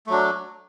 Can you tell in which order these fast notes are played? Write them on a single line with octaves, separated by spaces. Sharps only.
A3 F#3 D4